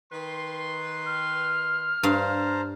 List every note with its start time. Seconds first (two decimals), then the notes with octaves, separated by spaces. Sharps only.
0.12 D#3 B4 C6
1.06 F6
2.03 G2 C5 F5 A5 A#5